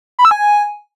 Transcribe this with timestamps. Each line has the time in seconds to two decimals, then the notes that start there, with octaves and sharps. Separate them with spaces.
0.19 B5
0.25 E6
0.31 G#5